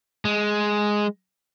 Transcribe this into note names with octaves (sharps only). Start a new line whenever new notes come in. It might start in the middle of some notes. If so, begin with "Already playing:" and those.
G#3